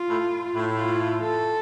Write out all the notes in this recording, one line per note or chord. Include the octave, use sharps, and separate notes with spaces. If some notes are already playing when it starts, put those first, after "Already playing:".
Already playing: F4
A2
A2
F4
A4